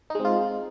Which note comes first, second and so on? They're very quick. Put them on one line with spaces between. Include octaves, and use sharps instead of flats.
D#4 G#3 C4 F4